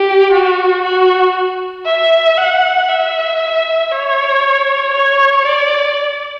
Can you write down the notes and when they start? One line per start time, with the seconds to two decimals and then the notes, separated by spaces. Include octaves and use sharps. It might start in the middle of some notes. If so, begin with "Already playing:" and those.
Already playing: G4
0.32 F#4
0.83 F#4
1.86 E5
2.37 F#5
2.88 E5
3.91 C#5
4.94 C#5
5.45 D5